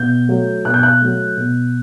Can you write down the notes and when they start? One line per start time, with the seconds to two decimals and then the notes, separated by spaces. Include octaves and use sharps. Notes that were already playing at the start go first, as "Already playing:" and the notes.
Already playing: B2 G6
0.29 F#3 A3
0.65 B2 F#6
0.74 G6
0.83 F#6
1.01 F#3 A3
1.37 B2